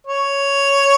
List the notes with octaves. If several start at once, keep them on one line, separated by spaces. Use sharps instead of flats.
C#5